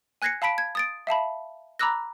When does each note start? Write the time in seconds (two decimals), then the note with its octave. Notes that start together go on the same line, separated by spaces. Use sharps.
0.22 G#5 F#6 G#6 A#6 C7 C#7
0.42 F5 A5 B5 B6 D7
0.58 G#6
0.75 D#6 A6 D7
1.07 E5 F5 A5 B5
1.79 A#5 B5 D6 E6 F#6 A#6